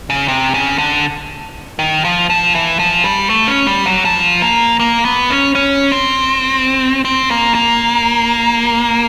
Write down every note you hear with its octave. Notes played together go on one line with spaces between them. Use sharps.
C#3
C3
C#3
D3
D#3
F3
F3
E3
F3
G3
A3
C#4
G3
F#3
F3
A#3
A#3
B3
C#4
C#4
C4
C4
A#3
A#3